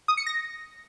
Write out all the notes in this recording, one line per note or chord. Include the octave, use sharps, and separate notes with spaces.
D#6
C#7
A#6